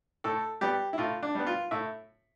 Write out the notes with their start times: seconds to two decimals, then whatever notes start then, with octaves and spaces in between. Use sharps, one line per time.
0.24 A2 A4
0.61 G3 B3 G4
0.93 E4
0.98 A2 F4
1.23 D4
1.35 G3 B3
1.47 F4
1.71 A2 E5